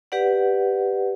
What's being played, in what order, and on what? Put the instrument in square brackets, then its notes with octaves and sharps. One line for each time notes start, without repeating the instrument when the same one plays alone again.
[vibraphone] G4 B4 D5 F#5